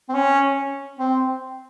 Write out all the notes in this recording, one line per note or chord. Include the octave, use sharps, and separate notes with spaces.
C4
C#4
C4